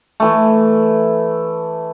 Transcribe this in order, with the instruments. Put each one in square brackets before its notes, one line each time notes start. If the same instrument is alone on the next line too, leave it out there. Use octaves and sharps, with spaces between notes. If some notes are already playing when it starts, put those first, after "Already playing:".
[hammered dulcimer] E3 A3